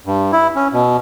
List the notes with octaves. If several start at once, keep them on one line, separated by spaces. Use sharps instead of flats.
G2
E4
C#4
B2